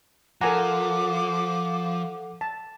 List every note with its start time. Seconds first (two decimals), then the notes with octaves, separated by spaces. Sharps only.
0.41 F3 A4 A#4 F#5 G#5 A#5 D6
2.41 A5